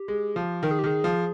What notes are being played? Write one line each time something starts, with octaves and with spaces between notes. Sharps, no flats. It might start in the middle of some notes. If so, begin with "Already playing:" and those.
Already playing: G4
G#3
F3
D#3 A#4
G#4
G4
D#3 G#4
F3